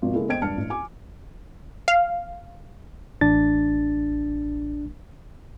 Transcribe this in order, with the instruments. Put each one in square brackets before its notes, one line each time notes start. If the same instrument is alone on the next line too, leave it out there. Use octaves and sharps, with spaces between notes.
[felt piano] G#1 B2 F3
C#3 G#3 A#3 E4 A4
E2 C5 D#5 G5 G#6 D7
E1 G2 D4 A5 F6 C#7
A1
G#5 D6
[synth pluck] F5
[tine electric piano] A1 D4 A6